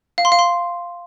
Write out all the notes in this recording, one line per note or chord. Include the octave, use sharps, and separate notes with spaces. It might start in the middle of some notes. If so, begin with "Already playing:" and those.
F5
C6
F5
C6